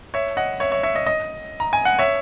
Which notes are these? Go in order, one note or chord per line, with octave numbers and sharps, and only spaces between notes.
C#5 E5
D#5 F#5
C#5 E5
C#5 E5
C#5 E5
D#5
D#5
A#5
G#5
F#5
C#5 E5